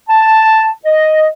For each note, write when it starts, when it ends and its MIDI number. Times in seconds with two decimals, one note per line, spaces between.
0.08 0.70 81
0.85 1.28 75